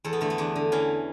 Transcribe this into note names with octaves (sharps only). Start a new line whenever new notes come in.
E2 A4
B3
D3 A3
B3
E2 D4
D3
E3 C#4